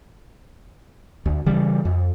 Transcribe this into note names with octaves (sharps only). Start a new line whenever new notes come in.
D2
C#3 E3 G3
F2